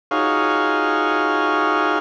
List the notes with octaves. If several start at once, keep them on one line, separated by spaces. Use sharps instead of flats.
D#4 F4 F#4 G#4 C#5 F5